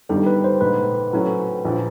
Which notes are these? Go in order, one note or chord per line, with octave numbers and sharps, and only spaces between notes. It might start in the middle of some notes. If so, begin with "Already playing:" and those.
G1 G2 D#3 G3 A4
B4
C5
A#1 G#2 D#3 B4
A2 F#3 A3 C#4
A#1 A#2 F3